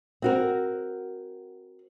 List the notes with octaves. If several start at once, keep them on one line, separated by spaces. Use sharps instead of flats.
C4 F#4 A#4